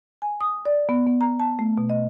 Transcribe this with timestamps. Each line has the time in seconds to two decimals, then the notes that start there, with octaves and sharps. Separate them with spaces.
0.22 G#5
0.41 D#6
0.65 D5
0.89 B3
1.07 B3
1.21 A#5
1.39 A5
1.59 A3
1.78 B2
1.90 D#5